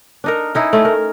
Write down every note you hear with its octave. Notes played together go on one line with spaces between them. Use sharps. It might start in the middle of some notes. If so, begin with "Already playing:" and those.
D4 D#4 A#4
C#4 D#4 E4
A3 C#4 D#5
A#4